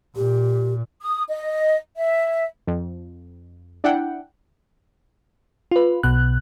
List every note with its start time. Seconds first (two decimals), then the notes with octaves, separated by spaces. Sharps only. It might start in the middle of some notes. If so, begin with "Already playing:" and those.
0.16 A#2 G4
1.01 D#6
1.29 D#5
1.97 E5
2.67 F2
3.84 D4 E4 F#5 G5
5.71 F4 B4
6.03 B1 B2 F#6